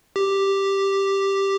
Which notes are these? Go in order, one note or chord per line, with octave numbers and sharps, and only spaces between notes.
G4